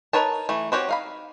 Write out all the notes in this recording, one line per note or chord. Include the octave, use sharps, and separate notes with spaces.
D#4 A#4 B4 C#5 A5
E3 A3
C4 F#4 G4 C#5
D#4 F5 B5